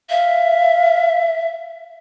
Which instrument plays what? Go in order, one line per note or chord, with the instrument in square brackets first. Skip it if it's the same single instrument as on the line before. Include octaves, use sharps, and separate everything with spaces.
[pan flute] E5 [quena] F5